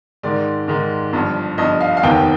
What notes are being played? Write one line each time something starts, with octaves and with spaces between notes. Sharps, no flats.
G#2 D#3 G#3 D5
G#2 D#3 G#3
G1 G2 F3
G1 G2 F3 D#5
F5
F5
F1 D#2 D#3 B3 G5